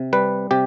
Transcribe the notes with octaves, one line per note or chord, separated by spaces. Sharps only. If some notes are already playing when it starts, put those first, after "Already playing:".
Already playing: C3
G3 B4
C3 G4